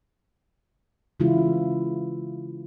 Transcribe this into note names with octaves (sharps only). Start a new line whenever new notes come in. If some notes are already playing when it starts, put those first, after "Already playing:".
C#3 E3 G#3 C#4 E4 F4